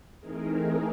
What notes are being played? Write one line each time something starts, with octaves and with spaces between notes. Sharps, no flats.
E3 A3 C4 D#4 G#4 A#4